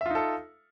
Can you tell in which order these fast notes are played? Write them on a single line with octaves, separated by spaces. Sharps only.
E5 F4 D#4 A4